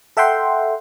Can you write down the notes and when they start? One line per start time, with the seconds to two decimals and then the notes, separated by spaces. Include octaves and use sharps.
0.17 A4 E5 F#5 G5 C6